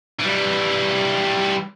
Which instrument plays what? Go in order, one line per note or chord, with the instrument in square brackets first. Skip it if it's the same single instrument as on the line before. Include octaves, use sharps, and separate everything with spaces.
[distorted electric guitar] E3 G3